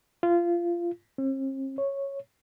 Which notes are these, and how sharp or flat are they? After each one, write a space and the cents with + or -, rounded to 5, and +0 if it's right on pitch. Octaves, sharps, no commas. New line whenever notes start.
F4 -20
C4 +45
C#5 -5